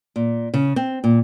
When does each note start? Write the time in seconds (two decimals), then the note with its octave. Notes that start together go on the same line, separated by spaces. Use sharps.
0.16 A#2
0.54 C#3
0.76 C4
1.04 A#2